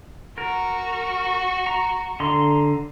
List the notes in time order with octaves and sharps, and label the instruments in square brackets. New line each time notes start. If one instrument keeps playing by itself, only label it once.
[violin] F#4 C#6 [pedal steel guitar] A#4
[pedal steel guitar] A#5
D3 A#5 C6